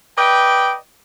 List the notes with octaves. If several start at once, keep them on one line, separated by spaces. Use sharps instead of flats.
B4 D5 D#5 G5